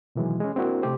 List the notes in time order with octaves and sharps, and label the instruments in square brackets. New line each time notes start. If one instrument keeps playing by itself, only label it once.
[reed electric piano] B2 D#3 E3 F#3 G#3
G#3 C#4
A#3 C4 D4 E4 F#4 A#4
C3 A3 G4 C5